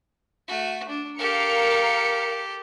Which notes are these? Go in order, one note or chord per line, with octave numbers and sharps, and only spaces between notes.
A3 F#4
D4
G4 A4 A#4 F5 C#7